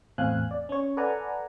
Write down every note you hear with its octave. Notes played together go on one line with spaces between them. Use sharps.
E2 A2 C4 F5 G#5 F#6
D5
C#4 C#5
A4 B4 D5 F#5 G#5 A#5